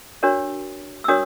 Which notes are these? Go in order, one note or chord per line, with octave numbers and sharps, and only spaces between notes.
D4 F#4 A#4 C#5
E6
D4 F#4 A#4 C#5 D#6